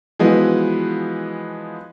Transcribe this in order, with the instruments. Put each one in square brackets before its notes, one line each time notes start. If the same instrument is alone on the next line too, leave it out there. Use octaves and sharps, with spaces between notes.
[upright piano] E3 F3 G#3 B3 F#4 B4